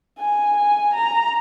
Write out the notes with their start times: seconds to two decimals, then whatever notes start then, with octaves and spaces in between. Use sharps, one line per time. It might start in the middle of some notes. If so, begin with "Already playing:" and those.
0.18 G#5
0.56 G#5
0.94 A#5